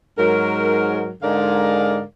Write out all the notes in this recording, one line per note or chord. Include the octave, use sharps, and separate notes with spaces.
G#2 F#3 A#4
G#2 D3 G#3 A#4 D5 F5